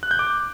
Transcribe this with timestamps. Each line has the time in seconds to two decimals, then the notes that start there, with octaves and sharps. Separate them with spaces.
0.03 F#6
0.11 G6
0.19 D6